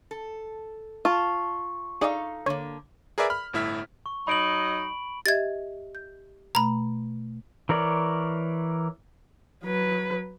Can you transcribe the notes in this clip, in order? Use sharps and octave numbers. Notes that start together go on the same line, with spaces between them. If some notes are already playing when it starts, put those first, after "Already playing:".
A4
F4 A5 C#6
D#4 G#4 A4 D5 D#5 F5
D3 A#3 C#5
G#4 A#4 B4 D5 E5
B5 F6
G1 A2 E4 E5 F6 B6
C#6
F#3 D#4 D#5 B5 D7 F#7
G4 D#5 E5 G#6 A6
G6
B2 A3 A#5 B5
E3 A#4 C#5 D5
F#3 B4